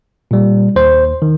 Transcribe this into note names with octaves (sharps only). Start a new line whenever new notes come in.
A#2 G3
D#2 C5
D#3